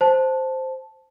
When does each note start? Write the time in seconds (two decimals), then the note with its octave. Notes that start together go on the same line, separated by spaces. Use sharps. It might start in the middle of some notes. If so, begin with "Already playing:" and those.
0.01 C5 A5